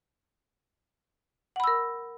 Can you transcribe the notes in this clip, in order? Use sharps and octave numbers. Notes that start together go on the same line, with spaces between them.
A#4 F#5 B5 E6